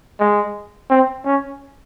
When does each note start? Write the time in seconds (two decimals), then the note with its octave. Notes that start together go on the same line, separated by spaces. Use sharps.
0.20 G#3
0.90 C4
1.25 C#4